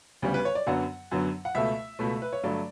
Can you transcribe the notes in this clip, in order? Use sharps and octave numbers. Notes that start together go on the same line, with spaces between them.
D2 C#3 G3 B3
B4
C#5
D5
F#2 D3 F#3 B3 F#5
F#2 D3 F#3 B3
F#5
C#2 B2 A3 E5
C#2 B2 A3
B4
C#5
G2 D3 F#3 A3 D5